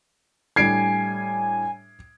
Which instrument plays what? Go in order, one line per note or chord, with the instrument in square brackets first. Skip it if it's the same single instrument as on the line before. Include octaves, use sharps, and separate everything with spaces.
[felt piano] A2 G3 D4 [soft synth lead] G#5 [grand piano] G#6 C7 D7